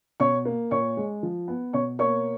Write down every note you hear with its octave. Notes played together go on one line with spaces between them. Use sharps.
B2 C#5 C#6
A#3
A#2 C#5 C#6
G#3
F3
B3
B2 C#5 C#6
A#3 C#5 C#6